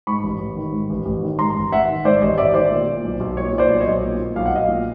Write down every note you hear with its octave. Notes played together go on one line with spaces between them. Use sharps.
G#2 B5 C#6
A1
A1
D#3
G#2
A1
A1
D#3
G#2 A#5 C6
A1
A1 E5 F#5
D#3
G#2 C5 D5
A1 C#5 D#5
A1 D5 E5
D#3 C5 D5
A#2
A#2
B1
B1
A#2 C#5
A#2
C5 D5
B1
C#5 D#5
B1
A#2
A#2
B1 F5
F#5
B1 D#5 F5
A#2